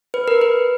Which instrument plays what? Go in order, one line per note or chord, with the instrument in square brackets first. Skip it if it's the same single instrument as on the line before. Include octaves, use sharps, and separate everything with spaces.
[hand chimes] B4
A#4
B4